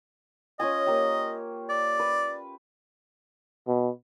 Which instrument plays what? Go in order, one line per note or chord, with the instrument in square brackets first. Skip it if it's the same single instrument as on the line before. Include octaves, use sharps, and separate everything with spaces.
[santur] C#4 F4 G#5 [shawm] D#5
[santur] A#3 G4
[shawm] D5
[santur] B4
[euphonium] B2